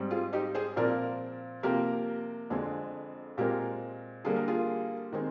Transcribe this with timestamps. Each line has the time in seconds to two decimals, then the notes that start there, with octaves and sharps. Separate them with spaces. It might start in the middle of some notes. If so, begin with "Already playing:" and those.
Already playing: G#2 G3 C4
0.10 F4 G#4
0.33 D#4 G4
0.55 G#4 C5
0.76 A#2 F3 C4 A#4 D5
1.63 C3 F3 A#3 G4 A#4
2.50 F2 D3 G#3 C4
3.38 A#2 G#3 C4 G4 A#4
4.25 D3 G3 A#3 G#4
4.36 A#4
4.48 F4 G#4
5.12 D#3 G#3 C4